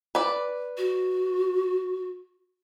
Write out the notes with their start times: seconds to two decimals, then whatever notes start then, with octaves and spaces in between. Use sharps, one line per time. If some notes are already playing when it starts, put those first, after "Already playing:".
0.15 B4 D5
0.77 F#4